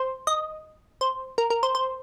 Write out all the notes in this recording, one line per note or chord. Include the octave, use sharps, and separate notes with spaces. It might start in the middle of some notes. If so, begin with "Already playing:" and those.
Already playing: C5
D#5
C5
A#4
A#4
C5
C5